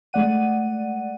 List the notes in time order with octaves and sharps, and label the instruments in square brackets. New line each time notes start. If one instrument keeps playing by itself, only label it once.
[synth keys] G#3 A3 D5 F#5 D#7